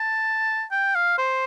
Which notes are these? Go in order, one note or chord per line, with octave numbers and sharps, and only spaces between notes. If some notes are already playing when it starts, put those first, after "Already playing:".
Already playing: A5
G5
F5
C5